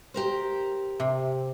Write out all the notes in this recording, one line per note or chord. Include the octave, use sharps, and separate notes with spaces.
G4 A#4 C5
C3